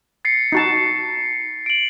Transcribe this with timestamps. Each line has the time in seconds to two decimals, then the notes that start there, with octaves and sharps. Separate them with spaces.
0.25 A6 C7 C#7
0.52 D#4 F#4 A5
1.66 D7 F#7